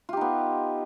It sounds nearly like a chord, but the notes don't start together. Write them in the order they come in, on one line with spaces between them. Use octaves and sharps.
F4 G4 D#4 B3